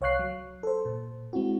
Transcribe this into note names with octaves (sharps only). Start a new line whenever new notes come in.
C2 C#5 F5 C#6 F#6 C7
F#3
A4 C5
A#2
G#3 C4 E4 F#4